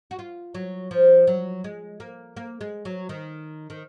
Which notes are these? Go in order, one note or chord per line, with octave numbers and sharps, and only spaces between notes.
F#4
F4
F#3
F3
F#3
G#3
A#3
A#3
G#3
F#3
D#3
D#3